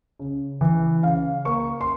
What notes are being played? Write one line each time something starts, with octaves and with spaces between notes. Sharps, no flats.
C#3
E3
C#3 F5
A#3 C#6
C6